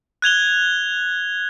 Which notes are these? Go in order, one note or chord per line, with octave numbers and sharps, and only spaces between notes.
F#6 G#6 F7 G7